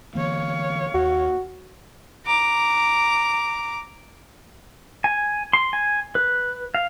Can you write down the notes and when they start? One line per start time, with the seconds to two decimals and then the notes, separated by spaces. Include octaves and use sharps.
0.15 D3 E3 A#3 C#5 F5
0.94 D#2 F#4
2.26 A#5 D6
5.04 G#5
5.53 C6
5.73 G#5
6.15 B4
6.75 F5